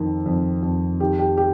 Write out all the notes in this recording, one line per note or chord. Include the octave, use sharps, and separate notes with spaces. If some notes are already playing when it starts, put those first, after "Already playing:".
Already playing: F2 D#3
F2
F2
D#3 G4
G4
G4